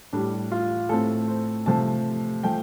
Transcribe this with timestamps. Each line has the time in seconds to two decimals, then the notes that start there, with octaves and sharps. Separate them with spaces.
0.13 A2 G3 D4
0.52 F4
0.89 A2 A3 C4 A4
1.28 C5
1.66 C3 F3 A3 C4 A5
2.43 F3 A3 G5